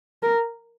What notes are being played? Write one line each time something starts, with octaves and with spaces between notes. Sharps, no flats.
A#4